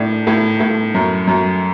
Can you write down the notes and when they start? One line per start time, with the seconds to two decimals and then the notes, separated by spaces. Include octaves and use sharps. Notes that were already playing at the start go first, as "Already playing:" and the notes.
Already playing: A2 D4
0.27 A2
0.60 A2
0.94 F#2
1.27 F#2